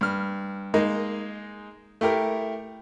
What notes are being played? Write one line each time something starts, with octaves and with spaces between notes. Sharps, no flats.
G2 F6
G#3 A#3 D#4
A3 E4 G4 A#4